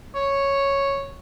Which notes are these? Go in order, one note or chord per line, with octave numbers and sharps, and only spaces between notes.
C#5